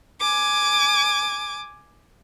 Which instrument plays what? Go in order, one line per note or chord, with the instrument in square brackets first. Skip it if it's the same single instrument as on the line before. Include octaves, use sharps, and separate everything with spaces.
[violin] G#5 D6